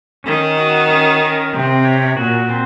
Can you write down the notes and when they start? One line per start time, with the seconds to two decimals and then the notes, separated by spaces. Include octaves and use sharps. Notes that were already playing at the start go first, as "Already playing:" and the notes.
0.24 D#3 C#4
0.57 F#4
0.88 C#4
1.21 A#4
1.53 C3 C4
1.85 C#5
2.17 A#2 F#4
2.49 C4